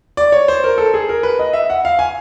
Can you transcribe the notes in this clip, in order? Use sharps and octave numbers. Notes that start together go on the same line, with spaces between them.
D5
C#5
C5
A#4
A4
G#4
A#4
B4
D#5
E5
F#5
F5
G#5